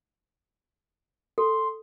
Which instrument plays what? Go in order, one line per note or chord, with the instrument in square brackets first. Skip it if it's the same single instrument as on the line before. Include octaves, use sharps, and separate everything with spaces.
[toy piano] A4 [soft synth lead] C6